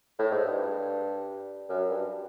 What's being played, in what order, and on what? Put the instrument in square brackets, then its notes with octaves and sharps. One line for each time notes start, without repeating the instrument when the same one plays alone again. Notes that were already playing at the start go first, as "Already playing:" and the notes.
[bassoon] A2
G#2
G2
F#2
G2